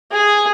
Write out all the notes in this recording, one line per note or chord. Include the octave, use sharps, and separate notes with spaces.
G#4